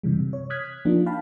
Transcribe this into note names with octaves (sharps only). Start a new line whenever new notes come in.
F#2 C3 E3 G3
C3
C#5
D#6 F6 F#6 G#6 B6
F3 A#3 D4 D#4 F4
F5 G5 A5 B5